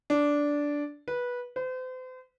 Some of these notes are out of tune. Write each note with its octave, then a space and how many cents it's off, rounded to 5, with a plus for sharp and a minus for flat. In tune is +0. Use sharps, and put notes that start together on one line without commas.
D4 -10
B4 -15
C5 -40